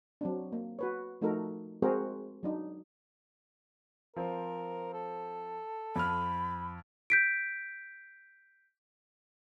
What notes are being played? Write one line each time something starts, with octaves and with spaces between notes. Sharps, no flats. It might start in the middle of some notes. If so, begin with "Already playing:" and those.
F#3 C4 D4
A#3
F#4 B4 C#5
F3 A3 D#4 F#4 A4 A#4
G#3 C4 F#4 G#4 A#4 C5
F#3 D4 D#4
F3 C4 A#4
A4
F2 B5 F6
G6 B6 D7